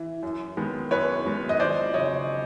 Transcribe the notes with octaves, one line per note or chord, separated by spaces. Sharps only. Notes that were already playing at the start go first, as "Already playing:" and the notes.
Already playing: E3
F#2
D#3 G#3 B3
F#2 B4 C#5
D#3 G#3 B3
D#5
F2 C5 D5
C#3 F#3 C#5 D#5